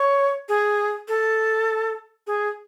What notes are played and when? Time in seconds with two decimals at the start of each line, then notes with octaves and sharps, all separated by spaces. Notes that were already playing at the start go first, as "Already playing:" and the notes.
Already playing: C#5
0.49 G#4
1.08 A4
2.27 G#4